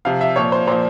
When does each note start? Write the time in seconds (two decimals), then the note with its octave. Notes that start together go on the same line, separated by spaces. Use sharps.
0.05 C3 F3 F5
0.21 E5
0.36 A#2 F3 C#5
0.52 C5
0.67 A#2 F3 C5